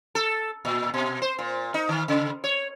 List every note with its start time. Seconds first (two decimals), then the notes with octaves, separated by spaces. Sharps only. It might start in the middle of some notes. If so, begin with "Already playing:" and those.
0.15 A4
0.65 A#2
0.94 B2
1.22 C5
1.39 A#2
1.74 D#4
1.89 D#3
2.08 C#3
2.44 C#5